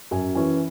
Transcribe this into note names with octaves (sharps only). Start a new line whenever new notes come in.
F#2 G#5
E3 C#4 G#5